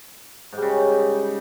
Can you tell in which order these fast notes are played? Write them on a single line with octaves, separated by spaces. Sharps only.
G#2 G3 C#3